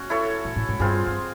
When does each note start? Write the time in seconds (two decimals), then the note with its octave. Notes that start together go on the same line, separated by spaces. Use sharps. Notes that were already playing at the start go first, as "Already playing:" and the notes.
Already playing: C#4 F#4
0.10 E4 A4 C#5
0.45 A2
0.56 A2
0.69 G#2
0.80 G2 C4 F4 G#4
1.06 G2